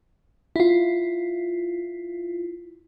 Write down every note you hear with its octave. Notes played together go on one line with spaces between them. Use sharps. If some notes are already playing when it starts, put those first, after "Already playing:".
E4 F4